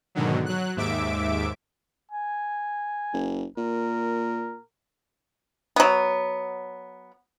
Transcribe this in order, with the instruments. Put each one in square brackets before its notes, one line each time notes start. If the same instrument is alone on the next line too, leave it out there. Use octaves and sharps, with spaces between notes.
[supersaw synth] G#2 B2 D3 D#3 F#3
F#3 F#6
D#2 G#2 E5 D6 D7
[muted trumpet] G#5
[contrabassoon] F#1
[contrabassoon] A#2 [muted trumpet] A#4
[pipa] F#3 B3